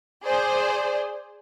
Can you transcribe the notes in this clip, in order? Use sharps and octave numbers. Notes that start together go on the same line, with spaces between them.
G#4 C5 D5